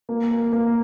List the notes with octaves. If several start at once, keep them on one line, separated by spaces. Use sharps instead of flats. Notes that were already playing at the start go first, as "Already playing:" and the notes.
A#3
A#3
A#3